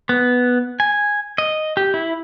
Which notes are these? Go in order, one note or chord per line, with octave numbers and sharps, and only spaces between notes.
B3
G#5
D#5
G4
E4